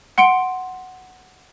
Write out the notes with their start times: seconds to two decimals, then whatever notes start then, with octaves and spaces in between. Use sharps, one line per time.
0.18 F#5 C6 C#7 D7